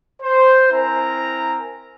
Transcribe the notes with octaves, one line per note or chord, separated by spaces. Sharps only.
C5
C4 E4 A#4 G#5 A#5